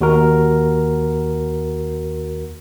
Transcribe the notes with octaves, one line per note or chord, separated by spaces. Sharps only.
D#2 F#4 A#4